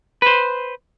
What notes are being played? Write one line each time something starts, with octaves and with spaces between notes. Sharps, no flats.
B4 C5